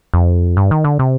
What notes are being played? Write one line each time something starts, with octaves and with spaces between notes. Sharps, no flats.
F2
G2
D#3
D3
C3